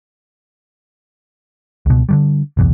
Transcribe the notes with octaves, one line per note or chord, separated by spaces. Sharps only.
C#2 B2
D3 D#3 G3
F#1 B1 E2